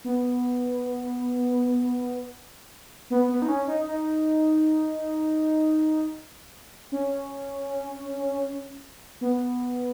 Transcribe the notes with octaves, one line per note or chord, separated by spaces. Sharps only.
B3
B3
B3
D#4
C#4
D#4
D#4
C#4
B3